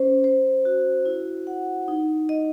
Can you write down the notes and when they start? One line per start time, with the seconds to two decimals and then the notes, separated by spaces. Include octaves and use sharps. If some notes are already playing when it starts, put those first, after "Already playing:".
Already playing: C#4 C5
0.24 C5
0.65 F#4
1.06 E4
1.47 F#5
1.88 D#4
2.29 D#5